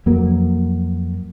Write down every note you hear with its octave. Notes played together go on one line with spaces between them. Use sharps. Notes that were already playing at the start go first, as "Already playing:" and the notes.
F2 F#3 A#3